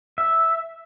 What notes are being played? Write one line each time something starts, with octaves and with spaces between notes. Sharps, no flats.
E5